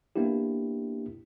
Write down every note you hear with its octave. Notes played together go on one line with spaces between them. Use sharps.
A#3 B3 D4 E4 G4